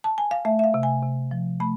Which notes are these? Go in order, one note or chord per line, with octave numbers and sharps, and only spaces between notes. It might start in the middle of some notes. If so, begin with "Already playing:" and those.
A5
G#5
F5
A3 E5
E5
F5
C3
G#5
C3
F3
A3 B5